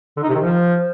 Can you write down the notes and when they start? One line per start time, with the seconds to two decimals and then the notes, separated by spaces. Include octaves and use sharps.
0.17 D3
0.23 D#4
0.29 C3
0.35 D#3
0.41 F3